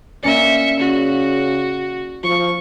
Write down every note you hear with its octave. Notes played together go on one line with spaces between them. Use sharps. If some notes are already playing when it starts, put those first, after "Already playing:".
A#3 C#4 D5 E5 C#7
C#3 F#4
F3 C#6